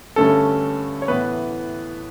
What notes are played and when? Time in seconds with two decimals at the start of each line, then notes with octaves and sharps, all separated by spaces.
0.16 G2 D3 A3 C#4 A4
1.02 C#5
1.08 A2 E3 B3 B4